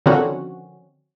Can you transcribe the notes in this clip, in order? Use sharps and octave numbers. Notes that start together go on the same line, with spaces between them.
D3 D#3 F3 C4 C#4 F#4